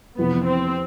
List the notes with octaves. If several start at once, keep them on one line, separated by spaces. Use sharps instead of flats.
F2 C3 E3 B3
C4